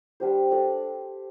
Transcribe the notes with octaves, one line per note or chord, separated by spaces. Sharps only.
G3 D4 G4 C5
D4 A4 D5